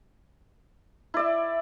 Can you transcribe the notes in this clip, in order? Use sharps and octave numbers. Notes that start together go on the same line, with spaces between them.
E4 D5 E5